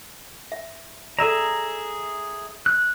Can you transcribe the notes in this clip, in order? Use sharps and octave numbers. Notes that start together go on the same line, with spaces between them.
E5
G#4 A4 D5 E5 A#5
F#6